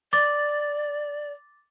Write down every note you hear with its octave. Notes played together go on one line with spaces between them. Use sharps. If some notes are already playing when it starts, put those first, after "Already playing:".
D5 D6 A6